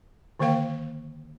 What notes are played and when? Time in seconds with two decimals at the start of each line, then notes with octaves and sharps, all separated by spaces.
0.39 D3 D#3 A#3 A#4 F5 G5